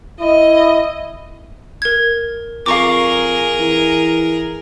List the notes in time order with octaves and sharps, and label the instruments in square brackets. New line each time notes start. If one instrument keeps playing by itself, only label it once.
[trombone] E4 [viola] D#5
[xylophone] A#4 G#6
[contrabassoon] F2 [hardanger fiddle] G#4 A#4 [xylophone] F5 C#6 D6
[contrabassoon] E3